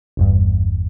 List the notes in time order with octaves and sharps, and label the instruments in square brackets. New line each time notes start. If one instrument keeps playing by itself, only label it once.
[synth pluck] G1 E2 G2